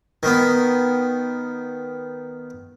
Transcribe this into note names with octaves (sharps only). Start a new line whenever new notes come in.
D#3 B3